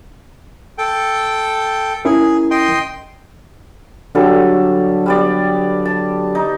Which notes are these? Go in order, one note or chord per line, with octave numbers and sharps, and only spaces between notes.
A4 G5
C#4 E4 G#4 A#4
D#5 G5 C6
D3 F#3 G3 A4
G3 B3 D5
A5
D#4